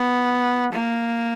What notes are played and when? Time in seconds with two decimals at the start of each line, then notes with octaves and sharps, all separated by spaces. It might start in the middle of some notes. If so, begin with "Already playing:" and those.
Already playing: B3
0.73 A#3